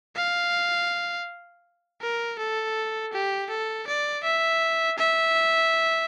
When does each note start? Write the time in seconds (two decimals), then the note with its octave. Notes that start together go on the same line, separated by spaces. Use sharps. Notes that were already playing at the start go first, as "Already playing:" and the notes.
0.17 F5
2.02 A#4
2.39 A4
3.13 G4
3.50 A4
3.87 D5
4.24 E5
4.98 E5